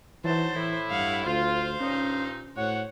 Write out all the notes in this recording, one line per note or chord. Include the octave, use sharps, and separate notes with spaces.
E3 F#3 D#4 C5 A5
A2 E3 E4
G2 F5 F#5
D2 F4 C5 F5
G2 A#2 C#4 D#4
A2 F#4 C5 C#5 F#5